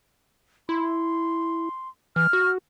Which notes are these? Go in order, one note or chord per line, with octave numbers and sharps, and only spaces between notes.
E4 C6
E3 F6
F#4